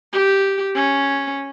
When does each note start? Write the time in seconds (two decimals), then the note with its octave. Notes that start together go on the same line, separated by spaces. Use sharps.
0.13 G4
0.76 C#4